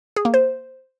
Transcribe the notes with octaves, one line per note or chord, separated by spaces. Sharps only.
G#4
A#3
C5